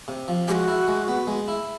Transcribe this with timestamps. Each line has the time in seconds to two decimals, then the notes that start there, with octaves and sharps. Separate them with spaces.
0.08 C3
0.28 F3
0.48 G#3 F#4 G4
0.68 E4
0.88 G#3
1.08 B3
1.27 G#3
1.48 E4